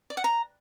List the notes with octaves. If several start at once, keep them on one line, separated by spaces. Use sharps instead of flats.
D5
F#5
A#5